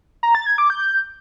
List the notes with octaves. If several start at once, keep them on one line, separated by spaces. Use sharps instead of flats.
A#5
A6
G#6
D6
G6